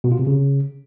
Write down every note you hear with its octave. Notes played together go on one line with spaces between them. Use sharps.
B2
F4
C3
C#3